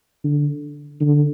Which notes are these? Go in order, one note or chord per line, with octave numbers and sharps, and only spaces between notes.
D3
D3